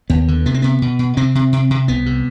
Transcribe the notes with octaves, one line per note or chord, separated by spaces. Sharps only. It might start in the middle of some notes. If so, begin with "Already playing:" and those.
D#2 B3
D3
C3 B3
C4
C3 B3
B2
B2
C3 C4
C3
C3
C3
C2 B3
C3